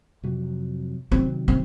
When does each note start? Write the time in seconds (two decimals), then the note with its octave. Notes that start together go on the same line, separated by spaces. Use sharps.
0.23 F2 C3 F#3
1.11 C3 D#3 F#3 C4
1.48 C4